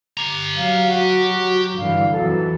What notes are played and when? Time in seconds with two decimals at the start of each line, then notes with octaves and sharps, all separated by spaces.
0.18 G4 A#5
0.57 F#3 F5
0.88 F#4
1.77 G2 D3 E3 F5
2.12 F2 E3 F#3 A4